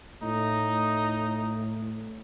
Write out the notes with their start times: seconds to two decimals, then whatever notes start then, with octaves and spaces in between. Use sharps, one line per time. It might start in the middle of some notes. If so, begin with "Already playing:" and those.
0.22 A2 D#4